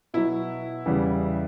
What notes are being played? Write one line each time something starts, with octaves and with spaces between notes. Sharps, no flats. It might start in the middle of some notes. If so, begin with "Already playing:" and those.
B2 F#3 E4
E2 C#3 E3 G3